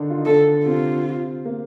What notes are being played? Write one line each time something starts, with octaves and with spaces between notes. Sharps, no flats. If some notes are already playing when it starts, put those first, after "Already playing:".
Already playing: D3 D#3 D4 D#4
F4
D#4
D3 D4 A4
C3 C4 F4
A#3